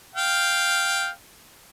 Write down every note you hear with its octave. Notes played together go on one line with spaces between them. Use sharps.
F5 G5